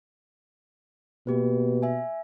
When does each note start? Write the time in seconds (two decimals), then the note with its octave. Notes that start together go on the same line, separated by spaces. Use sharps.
1.27 B2 A#3 G4 B4
1.83 E5 G#5